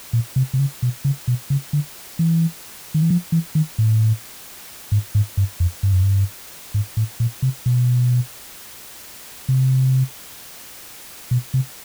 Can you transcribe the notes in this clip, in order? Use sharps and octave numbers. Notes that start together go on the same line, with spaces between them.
A#2
C3
C3
C#3
B2
C#3
B2
C#3
D3
E3
D#3
E3
F3
E3
D#3
A2
G#2
G#2
G2
F2
G2
F#2
G2
G#2
A2
A#2
C3
B2
C3
B2
C3